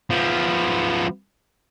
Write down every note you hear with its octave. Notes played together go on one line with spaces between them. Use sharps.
F3 B3